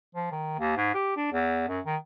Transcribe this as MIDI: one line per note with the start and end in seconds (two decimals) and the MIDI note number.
0.15 0.30 53
0.32 0.56 51
0.59 0.73 39
0.77 0.93 44
0.94 1.16 67
1.17 1.32 62
1.32 1.64 40
1.69 1.80 42
1.86 1.97 51